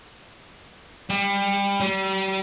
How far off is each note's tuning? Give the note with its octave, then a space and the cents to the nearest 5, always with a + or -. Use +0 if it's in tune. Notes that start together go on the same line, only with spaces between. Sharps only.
G3 +25
G3 -35